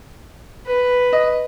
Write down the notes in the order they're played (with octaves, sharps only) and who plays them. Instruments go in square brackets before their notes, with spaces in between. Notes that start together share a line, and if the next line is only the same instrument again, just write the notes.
[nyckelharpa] B4
[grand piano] D#5